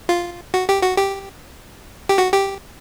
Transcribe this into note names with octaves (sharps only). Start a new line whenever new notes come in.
F4
F#4
G4
F#4
G4
G4
F#4
G4